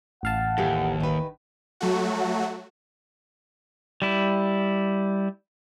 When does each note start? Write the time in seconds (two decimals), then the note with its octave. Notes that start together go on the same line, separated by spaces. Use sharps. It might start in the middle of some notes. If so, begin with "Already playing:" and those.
0.23 A1 F5 F#5 A5
0.58 D#2 E3 G4 A4
1.00 D#3 B4
1.80 F#3 A3 F#4
4.02 G3 E4